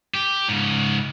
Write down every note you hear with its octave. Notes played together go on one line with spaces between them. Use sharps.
G4
G#2 C#3